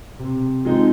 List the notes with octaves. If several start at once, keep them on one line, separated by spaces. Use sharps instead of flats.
C3
F3 G#3 C4 D#4